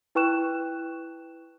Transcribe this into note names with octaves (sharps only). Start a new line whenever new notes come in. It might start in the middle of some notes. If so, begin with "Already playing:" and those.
E4 B4 G5 C#6 F#6 E7